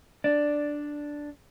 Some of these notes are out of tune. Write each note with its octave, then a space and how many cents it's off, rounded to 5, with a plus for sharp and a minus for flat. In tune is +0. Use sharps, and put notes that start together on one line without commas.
D4 +0 D5 +0